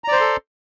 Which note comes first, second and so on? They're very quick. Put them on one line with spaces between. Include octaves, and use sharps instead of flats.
A#5 D5 C5 C6 A4